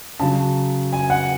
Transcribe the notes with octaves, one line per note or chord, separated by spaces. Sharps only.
C#3 F#3 A5
G#5
F#5